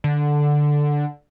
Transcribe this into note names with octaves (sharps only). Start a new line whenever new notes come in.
D3